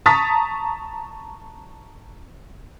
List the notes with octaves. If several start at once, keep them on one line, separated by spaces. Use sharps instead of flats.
A5 A#5 C#6 D#6 A6 B6